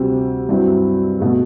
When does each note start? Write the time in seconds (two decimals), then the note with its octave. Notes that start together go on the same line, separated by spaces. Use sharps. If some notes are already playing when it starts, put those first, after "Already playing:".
Already playing: D2 C3 G3 C4
0.49 G2 F#3 C4 E4
1.20 B2 A3